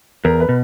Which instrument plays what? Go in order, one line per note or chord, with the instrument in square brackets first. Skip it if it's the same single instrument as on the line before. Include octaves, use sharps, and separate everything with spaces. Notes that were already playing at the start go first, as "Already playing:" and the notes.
[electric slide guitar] E2 [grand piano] A#4
[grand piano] B4
[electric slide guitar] B2